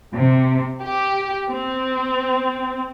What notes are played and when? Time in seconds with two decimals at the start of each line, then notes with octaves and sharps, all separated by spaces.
0.15 C3
0.83 G4
1.50 C4